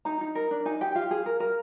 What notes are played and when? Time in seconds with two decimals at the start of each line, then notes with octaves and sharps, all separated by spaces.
0.05 D#4 A#5
0.21 D#4
0.35 A#4
0.51 D4
0.66 D#4 G#5
0.81 G4 G5
0.95 F4 F5
1.11 G#4
1.26 A#4
1.40 A#4